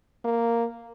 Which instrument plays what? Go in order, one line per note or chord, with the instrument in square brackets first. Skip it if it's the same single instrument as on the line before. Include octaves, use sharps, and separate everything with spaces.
[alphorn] A#3